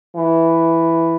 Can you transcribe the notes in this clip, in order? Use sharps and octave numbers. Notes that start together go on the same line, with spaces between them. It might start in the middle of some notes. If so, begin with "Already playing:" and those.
E3